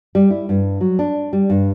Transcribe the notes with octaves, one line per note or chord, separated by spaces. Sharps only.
G3
E4
G2
F#3
D4
G3
G2